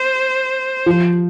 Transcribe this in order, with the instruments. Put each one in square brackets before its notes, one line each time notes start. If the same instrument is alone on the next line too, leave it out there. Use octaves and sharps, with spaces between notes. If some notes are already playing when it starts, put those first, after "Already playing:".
Already playing: [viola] C5
[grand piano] F3